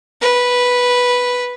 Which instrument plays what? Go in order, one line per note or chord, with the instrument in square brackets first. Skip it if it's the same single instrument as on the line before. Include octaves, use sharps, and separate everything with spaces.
[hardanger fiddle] B4